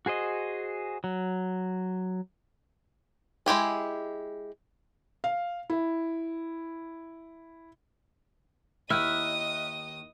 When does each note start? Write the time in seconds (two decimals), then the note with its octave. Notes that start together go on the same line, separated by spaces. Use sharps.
0.06 F#4 G#4 C5 D#5
1.04 F#3
3.46 G#3 E4 G4 G#4
5.24 F5
5.70 E4
8.90 D#2 D#3 E4 D#5 E5 D#6 F6 F#6